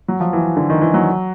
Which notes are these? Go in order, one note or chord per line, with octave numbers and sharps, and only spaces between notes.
F#3
F3
E3
D3
D#3
E3
F#3